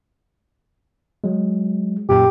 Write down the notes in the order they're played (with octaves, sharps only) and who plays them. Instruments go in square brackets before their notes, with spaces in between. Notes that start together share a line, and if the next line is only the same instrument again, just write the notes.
[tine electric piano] F#3 G#3
[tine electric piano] F#2 A#2 [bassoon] G4